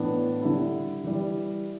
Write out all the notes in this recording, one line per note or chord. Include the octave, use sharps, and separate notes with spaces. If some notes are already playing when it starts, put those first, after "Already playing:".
Already playing: A2 E3 B3 D4
D3 G3 E4
E3 G3 E4